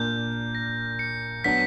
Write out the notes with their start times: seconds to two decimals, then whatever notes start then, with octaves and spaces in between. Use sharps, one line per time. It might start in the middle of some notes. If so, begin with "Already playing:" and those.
Already playing: A#2 A#3 D4 G6
0.55 A#6
0.99 C#7
1.44 F#3 B3 D4 B6